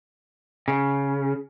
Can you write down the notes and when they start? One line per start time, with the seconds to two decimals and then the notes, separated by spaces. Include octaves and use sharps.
0.68 C#3